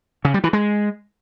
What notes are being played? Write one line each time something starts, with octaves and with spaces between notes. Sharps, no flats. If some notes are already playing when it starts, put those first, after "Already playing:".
C#3
G3
E3
G#3